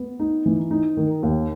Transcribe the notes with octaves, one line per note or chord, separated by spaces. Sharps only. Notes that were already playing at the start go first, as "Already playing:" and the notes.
Already playing: B3
D#4
E3
D#4
D#3
D#2